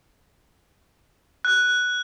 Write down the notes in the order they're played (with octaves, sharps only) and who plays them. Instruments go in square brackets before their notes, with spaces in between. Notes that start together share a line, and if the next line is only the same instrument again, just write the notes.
[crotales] F#6